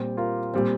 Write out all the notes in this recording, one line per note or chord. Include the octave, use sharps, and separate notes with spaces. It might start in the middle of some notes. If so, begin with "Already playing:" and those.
Already playing: A#2 G3 C4 G4 C5
F4 A#4
A#2 G3 C4